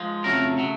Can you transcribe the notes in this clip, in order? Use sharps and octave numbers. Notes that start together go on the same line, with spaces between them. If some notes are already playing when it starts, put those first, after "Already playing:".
Already playing: F3 G#3
F2 C#3 F#3 A3 A#4
C#3 F#3 A3